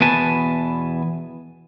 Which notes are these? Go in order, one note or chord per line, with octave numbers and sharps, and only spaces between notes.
E2 B2 B4 G#5 A5